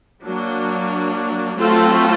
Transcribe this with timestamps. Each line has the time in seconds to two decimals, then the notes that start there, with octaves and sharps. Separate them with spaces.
0.24 F#3 A#3 D4
1.57 F#3 A3 C4 F4 A4